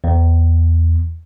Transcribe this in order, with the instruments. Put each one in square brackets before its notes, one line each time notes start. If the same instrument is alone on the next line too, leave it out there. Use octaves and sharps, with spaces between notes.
[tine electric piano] E2